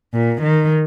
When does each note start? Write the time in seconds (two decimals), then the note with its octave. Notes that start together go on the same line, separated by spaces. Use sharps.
0.14 A#2
0.42 D#3